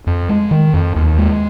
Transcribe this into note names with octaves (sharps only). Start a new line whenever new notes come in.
F2
G#3
D#3
F2
D#2
G#3